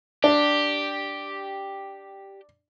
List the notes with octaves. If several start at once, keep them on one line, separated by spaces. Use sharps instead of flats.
D4 G4